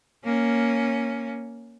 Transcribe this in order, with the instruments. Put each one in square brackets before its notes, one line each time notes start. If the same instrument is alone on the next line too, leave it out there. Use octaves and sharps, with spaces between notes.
[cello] A#3 C#4